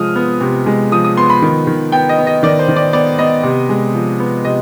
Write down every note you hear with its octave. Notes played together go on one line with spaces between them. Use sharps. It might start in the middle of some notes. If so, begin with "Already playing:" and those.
Already playing: C3 F3 G#3 D#6 F6
B3
C3
G#3
F3 D#6
D#6
B3 C6
B5
D#3
D#3
B3 G5
D#5
B3
D#5
D#3 D5
C5
D#3
D5
B3 D5
B3 D#5
C3
G#3
F3
B3
C3 D#5